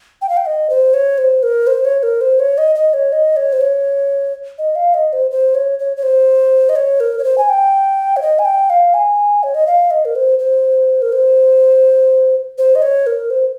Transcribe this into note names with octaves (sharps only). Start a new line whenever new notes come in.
G5
F5
G5
D#5
C5
C#5
C5
A#4
C5
C#5
A#4
C5
C#5
D#5
D#5
C#5
D#5
C#5
C5
C#5
D#5
F5
D#5
C5
C5
C#5
C#5
C#5
C5
D#5
C#5
A#4
C#5
C5
G#5
G5
C#5
D#5
G#5
G5
F5
G#5
C#5
D#5
F5
D#5
A#4
C5
C5
A#4
C5
C5
D#5
C#5
A#4
C5